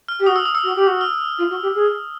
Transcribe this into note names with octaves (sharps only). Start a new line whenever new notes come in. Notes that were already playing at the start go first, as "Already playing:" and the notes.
F6
G4
F#4 D#6
E6
D#6
E6
F#4
G4
F#4
F6
F4
F#4
G4
G#4